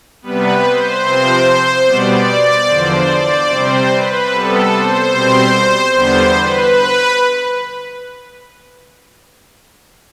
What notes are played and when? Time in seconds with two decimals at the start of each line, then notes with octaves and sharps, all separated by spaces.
0.22 C3 G3 B3 B4
0.63 C5
1.03 C3 F3 C4
1.85 B2 G3 B3 D5
2.67 E2 D3 F3 C5
3.08 D5
3.48 C3 G3 C4 C5
3.90 B4
4.30 C3 G3 B3 A4
4.72 C5
5.12 B2 G3 C4
5.93 E2 D3 G3 B3 C5
6.35 B4